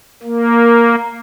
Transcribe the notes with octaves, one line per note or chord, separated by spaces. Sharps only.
A#3